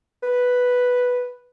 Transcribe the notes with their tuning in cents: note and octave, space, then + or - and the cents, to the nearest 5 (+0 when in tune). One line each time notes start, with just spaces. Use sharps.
B4 +0